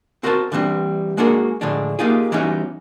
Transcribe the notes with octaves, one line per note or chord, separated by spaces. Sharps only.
C4 F#4 A#4 C5 F5 A5
D3 E3 G3 C4 D4
G#3 A#3 D4 F#4 G#4 A#4
A2 D3 F3 G#3 D4
A#3 D#4 F4 G4 G#4
E3 F#3 G3 B3 C#4 D#4